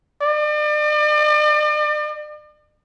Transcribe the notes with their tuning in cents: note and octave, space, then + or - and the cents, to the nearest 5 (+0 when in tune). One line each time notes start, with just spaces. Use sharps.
D5 +40